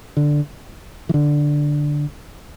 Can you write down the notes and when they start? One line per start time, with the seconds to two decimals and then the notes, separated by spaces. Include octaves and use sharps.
0.17 D3
1.09 E3
1.14 D3